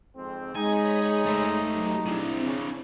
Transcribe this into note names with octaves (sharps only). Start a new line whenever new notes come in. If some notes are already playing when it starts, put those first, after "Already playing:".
F2 G#2 C4
G#3 D#4 C#5 G#5 B5 D#6
A3 C5
F#3 G4
C4 D4 E4 G#4
C#3